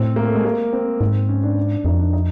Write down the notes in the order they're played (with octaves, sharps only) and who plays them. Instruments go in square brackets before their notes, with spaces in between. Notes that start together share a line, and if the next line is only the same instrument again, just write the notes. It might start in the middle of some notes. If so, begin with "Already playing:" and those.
Already playing: [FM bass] A2 [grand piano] C4
[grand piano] A#3
A3
G#3
A#3
C4
[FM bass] G#2
[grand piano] C#4
D4
[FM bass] F2 [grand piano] D#4
[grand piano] D4
D#4